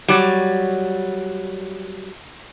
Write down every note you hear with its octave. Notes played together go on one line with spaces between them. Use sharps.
F#3 G3